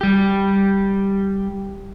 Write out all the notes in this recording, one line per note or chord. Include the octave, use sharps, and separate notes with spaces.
G3 G4